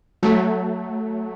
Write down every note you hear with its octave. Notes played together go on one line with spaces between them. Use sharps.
F#3 A3